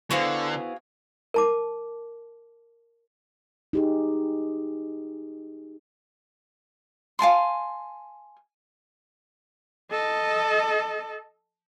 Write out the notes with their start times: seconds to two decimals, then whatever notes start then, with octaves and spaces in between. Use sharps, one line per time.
0.11 D3 B3 E4 F#4 G#4 C5 F5
1.34 A#4 A5 D6
3.73 D#4 G4 G#4
7.19 F5 G#5 A5 C6
9.91 A4 D#5